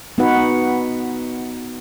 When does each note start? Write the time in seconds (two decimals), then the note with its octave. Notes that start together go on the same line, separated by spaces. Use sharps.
0.18 B3 D#4 F#4 B4 F#5